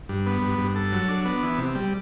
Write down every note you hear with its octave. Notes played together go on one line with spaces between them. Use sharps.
G2
B3
G2
G2
A4
F#3
D4
B3
E3
C3
G3